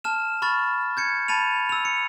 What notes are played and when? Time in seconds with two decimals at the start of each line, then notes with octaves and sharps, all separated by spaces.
0.04 A5 F6 E7
0.42 B5 C#6 F6 A6
0.97 G6 G#6 C#7
1.28 A5 B5 A6 D#7 F7
1.69 E6 F7
1.85 C#7